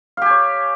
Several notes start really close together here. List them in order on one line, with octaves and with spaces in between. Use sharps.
F5 G4 G#5 C#5